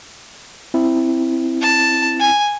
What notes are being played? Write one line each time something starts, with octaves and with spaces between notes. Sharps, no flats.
C4 E4
A5
G#5